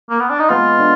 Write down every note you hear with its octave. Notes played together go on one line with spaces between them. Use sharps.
A#3
B3
D4
D#4
G#3 B3 F4
D3